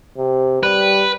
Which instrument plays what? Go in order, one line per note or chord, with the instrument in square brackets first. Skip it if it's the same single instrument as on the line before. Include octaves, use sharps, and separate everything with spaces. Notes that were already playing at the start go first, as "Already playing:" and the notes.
[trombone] C3
[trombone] G3 [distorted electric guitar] B4